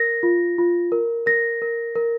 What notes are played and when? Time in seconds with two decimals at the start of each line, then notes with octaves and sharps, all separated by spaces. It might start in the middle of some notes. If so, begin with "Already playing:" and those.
Already playing: A#4 A#6
0.23 F4
0.58 F4
0.92 A#4
1.26 A#4 A#6
1.62 A#4
1.95 A#4